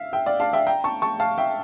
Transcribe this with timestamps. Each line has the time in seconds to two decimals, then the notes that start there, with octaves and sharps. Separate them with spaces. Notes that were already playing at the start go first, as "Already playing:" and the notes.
Already playing: E5 F5
0.13 E5 G5
0.26 D5 F5
0.40 F5 A5
0.53 E5 G5
0.67 G5 A#5
0.84 A5 C#6
1.02 A5 C#6
1.20 F5 A5
1.38 E5 G5